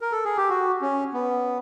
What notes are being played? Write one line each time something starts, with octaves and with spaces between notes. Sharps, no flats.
A#4
A4
G#4
G4
F#4
C#4
B3